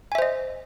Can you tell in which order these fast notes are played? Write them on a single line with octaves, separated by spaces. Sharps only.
G#5 E5 C5 D#5